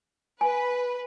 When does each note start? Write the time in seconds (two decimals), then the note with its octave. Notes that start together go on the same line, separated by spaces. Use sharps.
0.41 B4 G#5